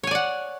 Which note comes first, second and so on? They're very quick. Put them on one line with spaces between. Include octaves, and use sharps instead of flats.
C#5 G#5 D5 F#5